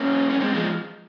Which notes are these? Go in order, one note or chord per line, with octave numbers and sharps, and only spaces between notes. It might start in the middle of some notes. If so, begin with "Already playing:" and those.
Already playing: A#3 C#4
C#4
G#3 C4
F3 G#3